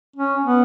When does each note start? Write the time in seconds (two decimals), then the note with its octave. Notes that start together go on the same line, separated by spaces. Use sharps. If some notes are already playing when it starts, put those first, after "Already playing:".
0.16 C#4
0.44 B3